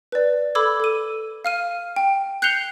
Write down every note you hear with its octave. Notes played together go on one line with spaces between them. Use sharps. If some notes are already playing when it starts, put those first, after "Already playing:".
B4 D5
A4 B5 D6 E6 G#6
A4 D#7
F5 F6 D#7
G5
F#6 G6 C7 C#7 F7 G7